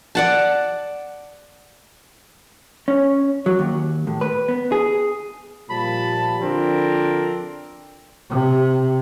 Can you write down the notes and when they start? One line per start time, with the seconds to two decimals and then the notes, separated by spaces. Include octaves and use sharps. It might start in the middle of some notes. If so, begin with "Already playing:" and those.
0.15 D5 F#5 A5
2.88 C#4
3.46 F#3
3.59 D#2
4.07 A2
4.21 B4
4.48 B3
4.72 G#4
5.69 A#2 F3 G3 A5 B5
6.41 D3 F3 C4 D4 A#4
8.30 C3